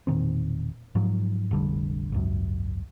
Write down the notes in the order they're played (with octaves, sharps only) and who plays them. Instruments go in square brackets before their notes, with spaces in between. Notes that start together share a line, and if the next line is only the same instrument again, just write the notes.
[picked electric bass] E1 A#2 D#3 C4
G#2 F3 F#3
F1 A#1 D3 G3
G#1 C#2 F#2